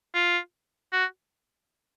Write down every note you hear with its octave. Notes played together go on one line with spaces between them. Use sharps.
F4
F#4